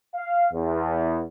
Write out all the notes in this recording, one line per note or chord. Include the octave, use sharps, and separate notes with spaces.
F5
E2